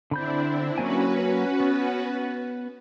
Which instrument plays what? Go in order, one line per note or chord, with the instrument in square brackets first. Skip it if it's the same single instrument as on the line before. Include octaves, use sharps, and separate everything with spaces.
[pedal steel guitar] D3 B5 G6 [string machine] C4 D4 E4
[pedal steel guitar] F#3 A#3 G#5 [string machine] C#4 F#4 B4
[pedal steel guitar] B3